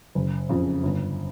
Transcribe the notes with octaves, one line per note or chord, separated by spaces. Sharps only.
F#1
F2 C#3
G1